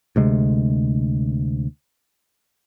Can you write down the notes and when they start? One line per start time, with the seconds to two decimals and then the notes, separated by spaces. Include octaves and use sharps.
0.16 D2 C3 G#3